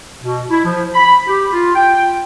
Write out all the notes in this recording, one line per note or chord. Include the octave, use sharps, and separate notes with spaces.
B2
E4
F3
B5
G4
F4
G5